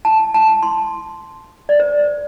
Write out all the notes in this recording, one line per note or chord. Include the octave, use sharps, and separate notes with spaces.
A5
A5
C6
D5
C5